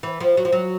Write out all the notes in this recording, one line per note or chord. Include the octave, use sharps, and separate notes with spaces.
E3
F3
F#3
F3
F#3